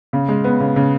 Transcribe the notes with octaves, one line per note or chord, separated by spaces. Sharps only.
C#3
G#3
B3
C#3
C#3